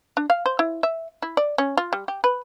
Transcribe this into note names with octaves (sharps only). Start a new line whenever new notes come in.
D4
F5
C5
E4
E5
E4
D5
C#4
F4
G3
G4
B4